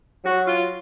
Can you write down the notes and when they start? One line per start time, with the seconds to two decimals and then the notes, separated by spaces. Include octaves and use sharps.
0.25 F#3 F#4
0.47 F4